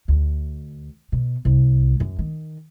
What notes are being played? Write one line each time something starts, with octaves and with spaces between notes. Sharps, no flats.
D2
B2
C2
F#2
D#3